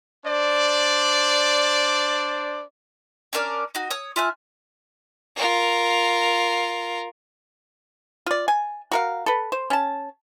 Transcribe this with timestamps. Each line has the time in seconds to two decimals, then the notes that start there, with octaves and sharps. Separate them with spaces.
0.25 D4 C5 D5
3.33 C#4 D4 A#4 D5
3.75 D#4 F#4
3.91 C#5 D#6
4.16 F4 E5 G#5 F#6
5.36 F4 A#4
8.26 F4 D5
8.48 G#5
8.91 F#4 A#4 F5
9.26 A4 B4
9.52 C5
9.70 C#4 A5